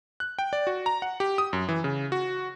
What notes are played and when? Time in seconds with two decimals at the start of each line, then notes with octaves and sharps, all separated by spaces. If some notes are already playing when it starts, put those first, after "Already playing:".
0.20 F#6
0.39 G5
0.53 D5
0.67 F#4
0.86 A#5
1.02 F#5
1.20 G4
1.38 D#6
1.53 F#2
1.69 E3
1.84 C#3
2.12 F#4